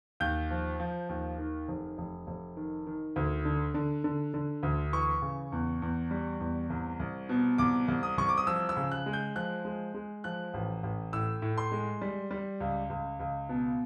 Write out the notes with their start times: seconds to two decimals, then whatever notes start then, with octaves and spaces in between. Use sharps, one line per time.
0.20 D#2 G6
0.50 F3
0.80 F3
1.09 D#2
1.38 D#3
1.68 F1
1.98 F1
2.27 F1
2.57 D#3
2.87 D#3
3.16 D2
3.45 D3
3.74 D3
4.04 D3
4.34 D3
4.63 D2
4.93 E3 C#6
5.22 C#3
5.52 E2
5.82 E2
6.11 G3
6.40 E2
6.70 C2
6.99 C2
7.29 B2
7.58 C2 D6
7.88 C2
8.03 D#6
8.17 C2 C#6
8.29 D6
8.37 D#6
8.47 F3 E6
8.69 E6
8.77 C#3
8.92 F#6
9.06 G#3
9.13 G6
9.36 F3 F#6
9.65 G#3
9.94 G#3
10.24 F3 F#6
10.54 A1
10.83 A1
11.13 A2 E6
11.42 A2
11.58 C6
11.72 G#3
12.02 G3
12.31 G3
12.60 C#2
12.90 C#2
13.20 C#2
13.49 B2